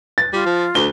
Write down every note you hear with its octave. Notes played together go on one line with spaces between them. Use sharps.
A6
G3 F4
F3
D2 G7